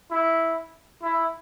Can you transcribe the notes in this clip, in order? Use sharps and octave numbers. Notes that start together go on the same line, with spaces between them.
E4
E4